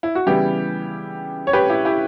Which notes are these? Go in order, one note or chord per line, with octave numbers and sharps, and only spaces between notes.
E4
F#4
C#3 E3 G3 B3 E4 G4
C#5
G4 B4
E4 G4
E4 G4